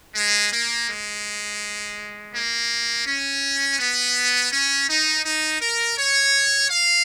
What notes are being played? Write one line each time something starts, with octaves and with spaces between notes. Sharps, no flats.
G#3
A#3
G#3
A#3
C#4
B3
C#4
D#4
D#4
A#4
C#5
F5